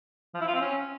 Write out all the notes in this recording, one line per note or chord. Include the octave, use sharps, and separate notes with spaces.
F3
E4
F4
C4
C#4